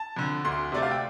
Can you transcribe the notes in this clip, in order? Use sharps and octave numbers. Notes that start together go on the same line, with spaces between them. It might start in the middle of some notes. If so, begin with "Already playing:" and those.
Already playing: A5
F2 D3
D2 C6
C3 A3 D5
F5
G5